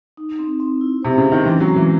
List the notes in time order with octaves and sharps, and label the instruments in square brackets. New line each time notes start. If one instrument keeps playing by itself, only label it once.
[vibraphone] D#4
C4
C4
E4
[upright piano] C3 [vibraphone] C5
[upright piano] C#3
[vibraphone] C#4
[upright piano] D#3
[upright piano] E3 [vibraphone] C4
[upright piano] F#3
[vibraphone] G#3
[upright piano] E3